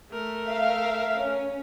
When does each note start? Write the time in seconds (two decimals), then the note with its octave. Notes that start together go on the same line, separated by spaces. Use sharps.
0.12 A3 A#4
0.49 E5 F5
1.21 C#4